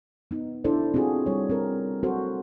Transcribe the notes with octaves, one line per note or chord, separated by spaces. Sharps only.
B3 D#4
D4 E4 A4 C5 D5
C4 F4 F#4 G#4
G3 C#5
C4 A4 A#4
C4 F#4 A4 C5